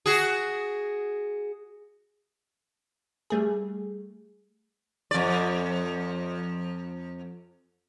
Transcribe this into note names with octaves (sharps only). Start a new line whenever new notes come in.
F#4 G#4
G3 A3 G#4
F2 D5